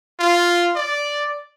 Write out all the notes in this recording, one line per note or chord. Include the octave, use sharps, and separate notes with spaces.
F4
D5